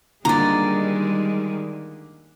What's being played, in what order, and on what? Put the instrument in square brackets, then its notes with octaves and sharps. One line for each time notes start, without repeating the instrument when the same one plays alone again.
[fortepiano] A#2 D3 [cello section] D#3 G3 G#3 [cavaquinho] D5 A#5